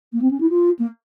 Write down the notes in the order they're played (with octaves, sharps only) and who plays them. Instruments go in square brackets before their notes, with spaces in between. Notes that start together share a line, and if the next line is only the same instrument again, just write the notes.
[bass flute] A#3
C4
C#4
E4
F4
A#3